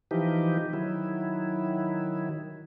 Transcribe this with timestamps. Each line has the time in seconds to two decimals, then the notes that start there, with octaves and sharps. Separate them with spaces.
0.11 E3 F3 D#4 G4
0.73 D#3 F#3 E4